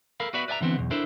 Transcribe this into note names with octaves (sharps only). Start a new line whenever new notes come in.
A4 A#4 F5 B5
B3 F#4 B4 D5 E5 B5
B4 D5 E5 G#5 A#5
D3 E3 B3 C4
B1 E2
D4 E4 A4 A#4 C5